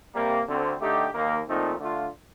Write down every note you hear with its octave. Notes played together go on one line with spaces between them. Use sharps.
C3 G3 A#3
D2 D3 A3 C4
D3 A3 D#4 G4
D#2 D#3 A#3
A#2 F3 A3 C4 D#4
D3 A3 D4 F4